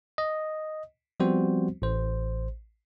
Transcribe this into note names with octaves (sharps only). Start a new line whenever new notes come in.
D#5
F3 G3 B3 C4 F#4 C5
A1 C5